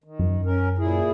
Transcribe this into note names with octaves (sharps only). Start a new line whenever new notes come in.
D#3
F#2
C#4 A#4
A#2 E4 G#4